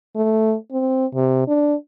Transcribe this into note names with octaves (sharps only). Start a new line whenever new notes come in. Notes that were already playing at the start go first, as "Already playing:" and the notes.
A3
C4
C3
D4